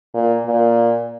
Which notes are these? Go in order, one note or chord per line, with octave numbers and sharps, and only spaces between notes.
A#2
A#2